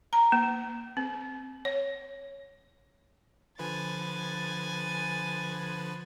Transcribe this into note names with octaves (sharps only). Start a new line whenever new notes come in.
A#5
A#3
C4
C#5
D3 F3 B4 G#5 A6